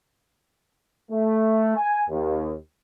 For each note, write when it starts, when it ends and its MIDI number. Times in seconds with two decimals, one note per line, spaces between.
1.10 1.75 57
1.77 2.03 80
2.09 2.54 39